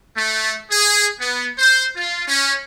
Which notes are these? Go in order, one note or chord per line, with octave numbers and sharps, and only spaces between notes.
A3
G#4
B3
C5
F4
C#4